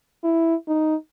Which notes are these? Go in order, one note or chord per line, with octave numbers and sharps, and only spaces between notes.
E4
D#4